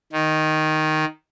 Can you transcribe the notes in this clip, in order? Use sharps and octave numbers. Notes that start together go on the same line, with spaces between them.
D#3